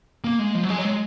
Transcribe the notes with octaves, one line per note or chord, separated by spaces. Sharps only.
A#3
G#3
F3
F#3
G#3
F#3
G#3